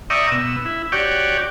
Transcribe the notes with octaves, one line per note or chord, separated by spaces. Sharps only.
D5 E5 G5 A#5 C#6 D#6
B2 E6
E4
F#4 G4 C#5 D5 G5